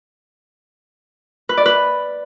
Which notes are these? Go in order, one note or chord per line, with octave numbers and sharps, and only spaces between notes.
B4
D5
B4